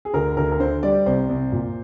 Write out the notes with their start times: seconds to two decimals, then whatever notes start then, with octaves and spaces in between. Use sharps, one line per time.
0.05 G#4
0.13 D2 A#4
0.37 D2 A#4
0.52 A#4
0.60 D3 C5
0.83 G3 D5
1.06 C2 C5
1.29 C2
1.52 A#2